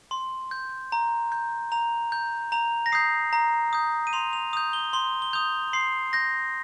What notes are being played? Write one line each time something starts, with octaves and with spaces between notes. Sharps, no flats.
C6
G6
A#5
G6
A#5 F7
G6
A#5 F7
A#6
D#6 G6 C7
A#5
D#6 G6
D#7
C6 F7
F7
D#6 G6 F7
G7
C6 G7
G7
D#6 G6 F7
C6 C7
G6 A#6